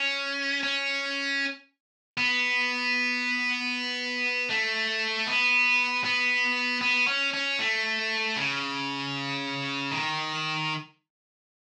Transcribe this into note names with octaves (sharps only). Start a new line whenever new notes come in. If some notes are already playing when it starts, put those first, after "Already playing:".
Already playing: C#4
C#4
B3
A3
B3
B3
B3
C#4
C#4
A3
C#3
D#3